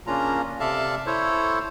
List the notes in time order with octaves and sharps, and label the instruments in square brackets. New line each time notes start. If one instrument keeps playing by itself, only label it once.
[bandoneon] C#3 A#3 C#4 D4 F4 A#5
C3 A4 D5 E5 F5 A5
E4 A4 C5 C#5